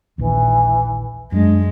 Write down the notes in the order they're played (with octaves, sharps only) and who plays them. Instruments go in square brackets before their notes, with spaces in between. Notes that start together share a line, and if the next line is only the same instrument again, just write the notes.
[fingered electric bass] A#1 D#2 [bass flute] E3
[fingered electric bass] F#2 [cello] G#3 [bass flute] D4